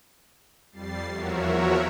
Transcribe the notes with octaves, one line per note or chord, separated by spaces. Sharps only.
F2 G3 A6 C7
E2 F3 F#4 A#4 C#5 E5